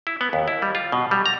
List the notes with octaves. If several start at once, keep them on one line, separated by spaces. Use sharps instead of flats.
E4
B3
D#2
E4
G3
F4
B2
G3
A#5